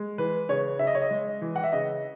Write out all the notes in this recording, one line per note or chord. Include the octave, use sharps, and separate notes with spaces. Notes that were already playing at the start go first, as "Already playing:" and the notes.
Already playing: G#3
E3 B4
C#3 C#5
C#3 E5
D#5
C#5
D#5
G#3
E3
F#5
E5
C#3 D#5